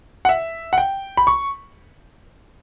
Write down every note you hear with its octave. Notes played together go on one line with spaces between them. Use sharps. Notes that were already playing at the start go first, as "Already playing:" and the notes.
F#5
E5
F#5
G5
B5
C#6